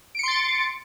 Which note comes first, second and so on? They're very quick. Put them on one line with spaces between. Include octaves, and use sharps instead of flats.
D7 C#7 C6 A6